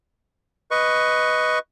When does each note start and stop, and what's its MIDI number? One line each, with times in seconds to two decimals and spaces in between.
0.71 1.59 71
0.71 1.59 75
0.71 1.59 85